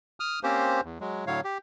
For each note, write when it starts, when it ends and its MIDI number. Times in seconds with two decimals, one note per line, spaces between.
0.20 0.40 87
0.20 0.40 89
0.43 0.81 58
0.43 0.81 60
0.43 0.81 61
0.43 0.81 67
0.43 0.81 72
0.84 0.98 40
1.00 1.25 54
1.00 1.25 56
1.27 1.41 45
1.27 1.41 50
1.27 1.41 54
1.27 1.41 73
1.27 1.41 77
1.44 1.58 67